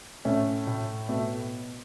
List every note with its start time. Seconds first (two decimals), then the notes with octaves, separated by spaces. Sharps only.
0.25 A2 A3 C#4
0.67 A2
1.09 B2 A3